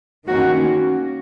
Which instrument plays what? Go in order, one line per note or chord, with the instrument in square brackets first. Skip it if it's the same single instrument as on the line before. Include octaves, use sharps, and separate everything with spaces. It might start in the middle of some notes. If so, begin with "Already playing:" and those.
[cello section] D#3 A#3 C#4 F#4